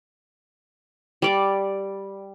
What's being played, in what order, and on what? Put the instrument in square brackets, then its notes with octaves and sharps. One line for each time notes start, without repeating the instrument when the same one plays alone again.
[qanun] G3 D5 D6